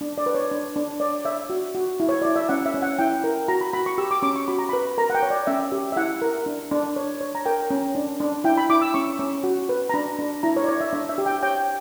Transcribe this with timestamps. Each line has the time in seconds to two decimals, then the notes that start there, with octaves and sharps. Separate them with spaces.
0.01 D4
0.18 D5
0.26 B4
0.35 C#5
0.51 D4
0.76 D4
1.00 C#5 D5
1.25 C#5 E5
1.50 F#4
1.75 F#4
2.00 E4
2.09 C#5
2.22 E4 D5
2.36 E5
2.49 C#4 F#5
2.66 E5
2.74 C#4
2.82 F#5
2.98 E4 G5
3.24 A#4
3.48 F#4 A#5
3.61 B5
3.73 F#4 B5
3.86 C#6
3.98 G4 E6
4.11 D6
4.22 C#4 D6
4.36 C#6
4.48 F#4 B5
4.59 A#5
4.69 B4 B5
4.98 A#4 A#5
5.10 F#5
5.15 G5
5.23 C#5
5.30 D5
5.47 C#4 E5
5.72 G4
5.92 E5
5.96 E4 F#5
6.22 A#4
6.46 D4
6.71 D4
6.96 C#5
7.21 C#5
7.35 A#5
7.46 A#4 G5
7.71 C#4
7.95 D4
8.20 D4
8.44 E4 G5
8.57 B5
8.69 E4 D6
8.82 E6
8.94 C#4 C#6
9.19 C#4
9.44 F#4
9.69 B4
9.89 A#5
9.94 D4 B5
10.19 D4
10.43 E4 A#5
10.57 C#5
10.64 D5
10.68 C#5
10.81 E5
10.93 D4 E5
11.09 E5
11.18 G4
11.26 G5
11.43 C#5 G5